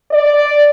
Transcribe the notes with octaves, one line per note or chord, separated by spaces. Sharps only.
D5